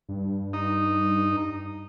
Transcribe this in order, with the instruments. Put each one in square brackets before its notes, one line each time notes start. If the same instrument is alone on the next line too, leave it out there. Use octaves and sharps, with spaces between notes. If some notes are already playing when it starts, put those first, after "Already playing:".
[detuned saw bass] G2
[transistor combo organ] D#4